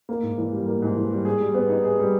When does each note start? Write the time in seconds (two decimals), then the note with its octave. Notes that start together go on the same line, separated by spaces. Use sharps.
0.09 A#3
0.23 G#2
0.38 E3
0.53 G3
0.66 A#3
0.82 G#2
0.96 E3
1.11 G3
1.25 G#4
1.41 G3
1.54 B3
1.69 D#4
1.84 G#4
1.99 G3